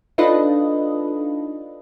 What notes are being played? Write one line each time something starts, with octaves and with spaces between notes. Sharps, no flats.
D4 D#4 F4 A4 B4 D#5